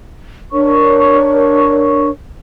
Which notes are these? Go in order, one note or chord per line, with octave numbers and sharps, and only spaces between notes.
D4 A#4 C#5 C#6